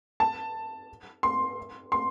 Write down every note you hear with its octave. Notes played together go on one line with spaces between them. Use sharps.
A5
C6
C6